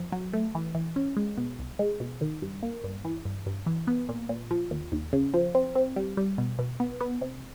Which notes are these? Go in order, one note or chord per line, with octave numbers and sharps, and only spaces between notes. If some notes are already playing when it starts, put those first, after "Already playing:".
Already playing: F2
F#3
A3
E3
E3
C#4
G#3
B2
C2
G#3
B2
D#3
G2
A#3
G2
E3
G2
G2
E3
B3
A#2
A#2
F3
D#2
D#2
C#3
F3
C4
C4
G3
G3
B2
B2
B3
B3
C3